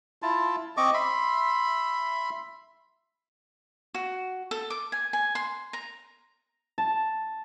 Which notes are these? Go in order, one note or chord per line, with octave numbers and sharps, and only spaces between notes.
E4 F4 A5
C4 D#5 C#6 D6
E5 B5 C6
F#4
A4
D6
G#5
G#5
C6
A#5
A5